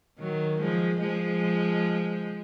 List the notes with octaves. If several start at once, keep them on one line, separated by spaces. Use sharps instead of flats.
D#3 F#3
F3 G#3
F3 G#3